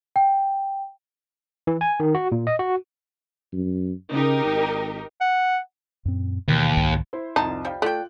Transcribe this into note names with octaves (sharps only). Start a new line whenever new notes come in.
G5
E3
G#5
D#3
F#4
A#2
D#5
F#4
F#2
C#3 D#4 G4 A#4
G#1
F#5
F#2 A#2 C4
D#2 B2 E3
C2 G#2 D#3
E4 C5
C2 F2 D3 D#4 A5
F3 G3 F5 G5
A3 F4 D5 G5 F#6